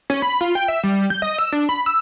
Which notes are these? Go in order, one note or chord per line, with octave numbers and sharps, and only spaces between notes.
C#4
B5
F4
G5
E5
G3
G6
D#5
E6
D4
B5
E6